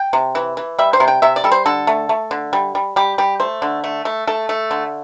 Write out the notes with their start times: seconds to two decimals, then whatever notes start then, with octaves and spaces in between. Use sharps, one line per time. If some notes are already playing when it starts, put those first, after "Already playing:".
Already playing: G5
0.13 C3
0.35 E3
0.57 E3
0.79 G3 E5
0.93 C5
1.00 C3
1.08 G5
1.22 C3 E5
1.36 D5
1.44 G3 A4
1.52 C5
1.66 D3 A4
1.87 A3
2.09 A3
2.31 D3
2.53 G3
2.75 G3
2.96 G3 G4
3.18 G3 G4
3.40 A3 C5
3.62 D3
3.84 A3
4.05 A3
4.27 A3 A4
4.49 A3
4.71 D3